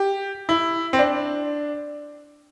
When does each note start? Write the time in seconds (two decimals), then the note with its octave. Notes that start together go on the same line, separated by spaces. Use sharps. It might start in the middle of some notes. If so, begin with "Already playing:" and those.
Already playing: G4
0.49 E4
0.93 C4
0.99 D4